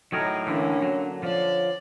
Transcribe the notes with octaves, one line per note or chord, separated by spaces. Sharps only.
A2 F#3 D#4 G#4 A#4
D3 E3 A#3 C#4 D4
D3 F#3
F3 C#5 D5